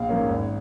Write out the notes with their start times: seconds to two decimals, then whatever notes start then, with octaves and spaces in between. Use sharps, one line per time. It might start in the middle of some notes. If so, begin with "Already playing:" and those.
Already playing: A#1 F5
0.09 G#2 F3 A#3 C#4
0.29 G#1